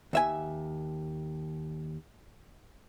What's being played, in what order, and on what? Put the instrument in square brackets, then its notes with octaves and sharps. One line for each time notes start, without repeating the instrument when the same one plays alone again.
[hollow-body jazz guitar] D#2 E5 G#5